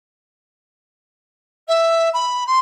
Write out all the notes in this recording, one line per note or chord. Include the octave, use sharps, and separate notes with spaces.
E5
B5
C6